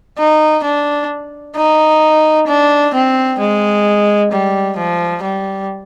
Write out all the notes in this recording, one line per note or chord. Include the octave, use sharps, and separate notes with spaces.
D#4
D4
D#4
D4
C4
G#3
G3
F3
G3